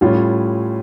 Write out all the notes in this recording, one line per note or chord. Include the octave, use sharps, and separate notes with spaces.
A2 G3 C#4 F4